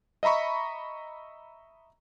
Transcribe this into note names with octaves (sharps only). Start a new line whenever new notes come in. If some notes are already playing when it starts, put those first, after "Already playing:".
D#5 E5 A#5 B5 C#6